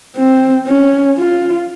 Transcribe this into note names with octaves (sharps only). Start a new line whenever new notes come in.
C4
C#4
F4